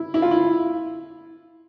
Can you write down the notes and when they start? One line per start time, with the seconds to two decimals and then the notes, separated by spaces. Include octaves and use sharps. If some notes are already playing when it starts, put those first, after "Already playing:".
Already playing: E4
0.14 E4
0.22 F4
0.31 E4